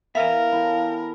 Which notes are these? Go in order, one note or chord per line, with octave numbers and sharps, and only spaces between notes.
E3 B3 A#4 B4 E5 F5
E4 G4 A4